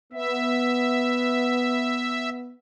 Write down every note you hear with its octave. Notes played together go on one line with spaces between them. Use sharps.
B3 E5